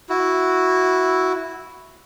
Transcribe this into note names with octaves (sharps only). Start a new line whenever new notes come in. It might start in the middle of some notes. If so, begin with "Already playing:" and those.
E4 F#4